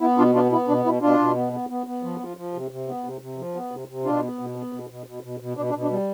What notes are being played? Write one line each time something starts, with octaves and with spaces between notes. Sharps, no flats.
B3 E4
B2 D4 F4
B3 D4 F4
B3 E4
B2 D4
B2 E4
B2 D4 F4
B2
B3
B3
B3
B3
F3
F3
F3
C3
C3
B3
C3
C3
F3
B3
C3
C3
B2 D4 F4
B3
B2
B3
B2
B2
B2
B2
B2
B2 D4
D4
B2
D4
G3